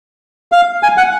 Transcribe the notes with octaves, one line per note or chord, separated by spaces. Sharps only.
F5
G#5
F#5